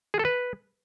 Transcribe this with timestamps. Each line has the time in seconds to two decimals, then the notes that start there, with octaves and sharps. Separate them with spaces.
0.14 G#4
0.19 A4
0.25 B4